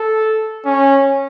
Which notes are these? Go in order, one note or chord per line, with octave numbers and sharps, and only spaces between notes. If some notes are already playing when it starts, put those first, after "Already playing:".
Already playing: A4
C#4